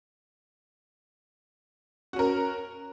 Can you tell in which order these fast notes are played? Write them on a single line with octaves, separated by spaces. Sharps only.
F#4 C#4 A#4